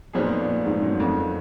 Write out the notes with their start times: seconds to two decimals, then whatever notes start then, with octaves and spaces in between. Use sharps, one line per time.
0.13 F2 A#2 F3 B3 D#4 G#4
0.40 A#2
0.65 G#2
0.82 F#2
1.00 F2